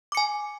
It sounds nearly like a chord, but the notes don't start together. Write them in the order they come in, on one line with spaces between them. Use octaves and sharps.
D6 C#7 G#5